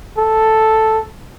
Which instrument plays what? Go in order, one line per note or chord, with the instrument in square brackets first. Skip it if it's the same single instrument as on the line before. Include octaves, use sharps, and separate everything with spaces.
[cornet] A4